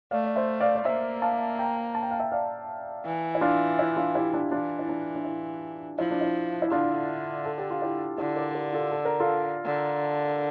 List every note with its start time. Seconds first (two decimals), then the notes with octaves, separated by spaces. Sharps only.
0.11 A3 D5 F5
0.24 D5
0.36 C5 E5
0.60 D5 F5
0.75 D5
0.85 A#3 C5 E5
1.22 F5 A5
1.59 G5 A#5
1.95 A5
2.03 G5
2.11 F5
2.19 E5 G5
2.32 D5 F5
3.05 E3
3.35 E4
3.41 D4 F4
3.79 E4
3.96 D4 F4
4.15 E4 G4
4.33 D4 F4
4.51 E3 D4 F4
4.79 E4
4.89 D4
5.15 D4
5.25 E4
5.98 F3 E4
6.11 D4
6.21 E4
6.62 E4
6.71 D3 D4 F4
7.46 A4
7.58 G4
7.70 F4
7.82 E4 G4
8.18 D3 E4 G4
8.36 A#4 D5
8.55 G4 A#4
8.73 F4 A4
8.92 A4
9.05 A#4
9.20 F4 A4
9.65 D3